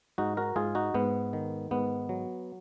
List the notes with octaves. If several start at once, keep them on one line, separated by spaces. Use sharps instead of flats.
G#2 D#4 F#4
F#4 A#4
G#2 F4 G#4
D#4 F#4
G#2 B3
D#3
G#2 B3
F#3